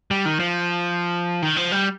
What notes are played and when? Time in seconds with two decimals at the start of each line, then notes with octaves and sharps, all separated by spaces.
0.11 G3
0.26 D#3
0.40 F3
1.42 D#3
1.57 F3
1.72 G3